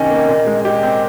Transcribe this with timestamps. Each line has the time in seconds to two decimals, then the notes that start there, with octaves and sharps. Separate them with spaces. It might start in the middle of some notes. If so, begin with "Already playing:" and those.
Already playing: C3 D#3 C#4 D#5
0.10 A#3
0.28 A#2
0.47 G#3
0.65 G4 D#5
0.83 C4